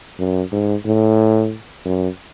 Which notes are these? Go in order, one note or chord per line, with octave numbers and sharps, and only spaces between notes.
F#2
G#2
A2
F#2